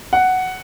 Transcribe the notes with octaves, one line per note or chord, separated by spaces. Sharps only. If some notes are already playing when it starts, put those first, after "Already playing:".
F#5